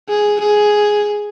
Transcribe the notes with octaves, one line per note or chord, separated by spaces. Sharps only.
G#4
G#4